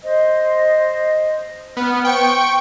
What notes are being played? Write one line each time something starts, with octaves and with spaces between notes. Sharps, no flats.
C5 D#5
B3 F6
C5 G5 C#6